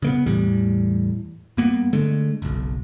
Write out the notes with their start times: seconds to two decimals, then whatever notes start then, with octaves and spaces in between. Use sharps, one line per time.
0.02 C#3 A#3 B3
0.26 E2 A2 E3 G3
1.57 G2 A#3 B3
1.93 D3 G#3 A3
2.42 F#1 B1